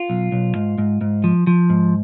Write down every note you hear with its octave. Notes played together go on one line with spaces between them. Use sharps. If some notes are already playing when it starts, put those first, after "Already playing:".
Already playing: F4
B1
B1
G#2
G#2
G#2
F3
F3
G#2